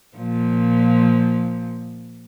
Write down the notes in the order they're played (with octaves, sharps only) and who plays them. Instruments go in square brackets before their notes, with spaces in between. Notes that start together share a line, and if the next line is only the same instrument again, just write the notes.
[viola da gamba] A#2 F3